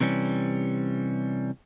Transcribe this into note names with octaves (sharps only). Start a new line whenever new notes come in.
C3 E3 G3 C#4